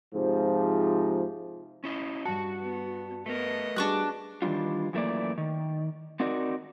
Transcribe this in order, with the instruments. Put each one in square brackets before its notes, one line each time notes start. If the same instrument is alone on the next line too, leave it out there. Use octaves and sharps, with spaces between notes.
[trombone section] G#2 C3 F3
[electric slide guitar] C#4 E4 D#5
[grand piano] G2 A5 [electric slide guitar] F#4
[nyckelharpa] B3
[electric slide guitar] A3 A#4 [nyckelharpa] B3 D#5
[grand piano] G3 F#4 G#4 [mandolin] D4 C#6 F#6
[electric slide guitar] D#3 E3 G3 D4 F4
F#2 E3 A3 A#3 D5
D#3
C4 D#4 F#4 A#4 D5